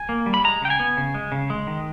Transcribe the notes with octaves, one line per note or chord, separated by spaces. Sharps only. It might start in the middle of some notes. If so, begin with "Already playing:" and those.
Already playing: G#5
A#3
G3
B5
G#3 A#5
C#3 G5
G#5
B3
C#3
G#3
C#3
G#3
D#3